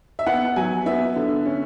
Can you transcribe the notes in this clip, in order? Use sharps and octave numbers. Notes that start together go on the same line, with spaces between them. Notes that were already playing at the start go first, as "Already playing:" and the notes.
E5
B3 F#5
F#3 G#5
B3 E5
D3
C#4